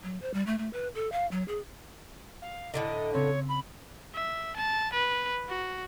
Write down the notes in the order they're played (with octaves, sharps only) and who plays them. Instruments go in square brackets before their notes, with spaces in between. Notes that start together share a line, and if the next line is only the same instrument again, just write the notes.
[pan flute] F#3
C5
G3
A3
A3
B4
A4
F5
F#3
G#4
[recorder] F5
[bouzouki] A2 D3 D#3 [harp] D5 A#5 [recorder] D#5
[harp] C#3 C4 C#4 [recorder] C#5
[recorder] B5
[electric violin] E5
A5
B4
F#4